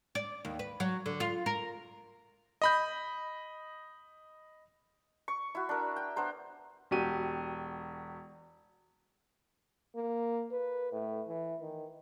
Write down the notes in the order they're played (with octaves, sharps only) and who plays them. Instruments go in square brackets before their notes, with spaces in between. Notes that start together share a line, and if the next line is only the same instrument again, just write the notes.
[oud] D5
D#2
B4
F#3
D3
F4
A#4
[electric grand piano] D#5 B5 G6
[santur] C#6
E4 F#4
D4 A#4
G5
B3 D4 C5 A#5
[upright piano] E1 F#4 G4 D#7
[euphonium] A#3
B4
A2
E3
D#3